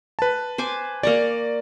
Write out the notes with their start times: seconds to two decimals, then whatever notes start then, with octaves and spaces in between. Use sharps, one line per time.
0.19 B4 A5
0.58 C5 G#5 D6
1.03 A#3 D5 A#5 C#6